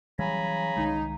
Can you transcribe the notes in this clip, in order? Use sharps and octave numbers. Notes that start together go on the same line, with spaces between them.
C#3 E3 F#3 G3 G#5 A#5 B5
C2 D#3 G#3 D#4